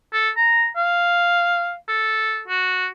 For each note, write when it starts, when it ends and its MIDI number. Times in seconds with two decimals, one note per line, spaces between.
0.13 0.29 69
0.36 0.68 82
0.76 1.74 77
1.88 2.42 69
2.48 2.87 66